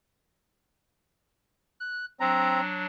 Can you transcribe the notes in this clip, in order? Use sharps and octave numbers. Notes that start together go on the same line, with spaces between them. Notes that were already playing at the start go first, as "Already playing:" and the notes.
F#6
F#3 C4 D4 A#5